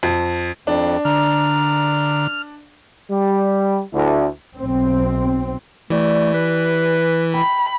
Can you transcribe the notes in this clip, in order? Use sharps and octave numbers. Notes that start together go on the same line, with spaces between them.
F2
F2 D4
D3 A#5 F6
G3
D2 E4
B1 C4
E3 A3 G4 D5
B4
G5 B5